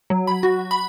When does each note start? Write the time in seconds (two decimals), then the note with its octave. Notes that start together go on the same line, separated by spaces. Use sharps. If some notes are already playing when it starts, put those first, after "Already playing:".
0.10 F#3
0.27 B5
0.43 F#4
0.71 B5